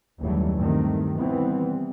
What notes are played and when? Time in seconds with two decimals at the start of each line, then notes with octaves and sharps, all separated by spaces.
0.20 F#1 D#2 E3 F#3 G3 A3
0.56 G2 C3 D#3 A3
1.16 E3 G3 B3 C4